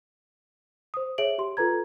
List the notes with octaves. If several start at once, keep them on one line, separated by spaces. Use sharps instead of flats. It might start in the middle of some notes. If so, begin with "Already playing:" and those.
C5 D#6
G#4 C#5 E5 D7 F#7
G4 C6
F4 A4 B4 A#5 G#6